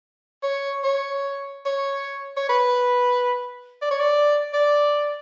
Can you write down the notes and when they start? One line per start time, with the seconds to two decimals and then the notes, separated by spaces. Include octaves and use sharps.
0.43 C#5
0.84 C#5
1.66 C#5
2.37 C#5
2.49 B4
3.82 D5
3.91 C#5
4.00 D5
4.53 D5